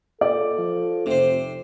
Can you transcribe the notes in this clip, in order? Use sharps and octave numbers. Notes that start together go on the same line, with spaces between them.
A#2 A4 D5
F3
F1 C3 C5